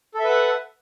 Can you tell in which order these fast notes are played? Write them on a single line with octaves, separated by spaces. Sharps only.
A4 E5 B4 F#5